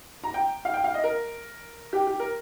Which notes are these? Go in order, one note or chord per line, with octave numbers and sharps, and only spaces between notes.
A#5
G5
F5
G5
F5
D#5
A#4
G4
G4
A#4